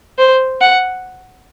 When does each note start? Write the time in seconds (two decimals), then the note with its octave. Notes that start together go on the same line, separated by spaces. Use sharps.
0.18 C5
0.61 F#5